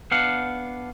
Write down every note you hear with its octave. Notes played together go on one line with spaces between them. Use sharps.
B3 D4 F5 F#5